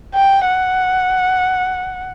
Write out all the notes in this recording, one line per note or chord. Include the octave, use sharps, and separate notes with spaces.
G5
F#5